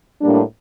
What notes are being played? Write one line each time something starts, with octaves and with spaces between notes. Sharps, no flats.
A2 G3 A#3 D4